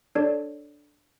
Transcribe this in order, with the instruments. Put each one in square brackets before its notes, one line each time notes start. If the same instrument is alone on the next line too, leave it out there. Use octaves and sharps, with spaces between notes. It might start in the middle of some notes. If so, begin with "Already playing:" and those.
[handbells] D4 A4 C#5 D5